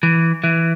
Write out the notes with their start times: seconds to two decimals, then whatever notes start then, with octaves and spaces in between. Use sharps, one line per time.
0.03 E3
0.44 E3